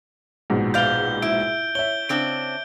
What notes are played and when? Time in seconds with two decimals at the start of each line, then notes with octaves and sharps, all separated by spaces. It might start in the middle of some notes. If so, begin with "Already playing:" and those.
0.50 A#1 G#2 B2
0.74 B4 D5 F5 G6 G7
1.22 E4 D7
1.75 C#5 E5 G7
2.09 C#3 C4 D4 D7 G7